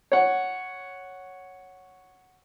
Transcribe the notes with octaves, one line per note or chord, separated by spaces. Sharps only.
C#5 F#5